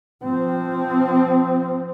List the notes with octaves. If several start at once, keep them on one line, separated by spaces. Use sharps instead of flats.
F3 C4